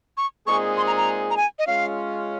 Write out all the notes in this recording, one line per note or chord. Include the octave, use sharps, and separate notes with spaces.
C#6
A#2 G#3 C4 D#4 G#4 C#6
C6
A#5
A#5
A#5
G#5
D#5
G#3 C#4 F4 F5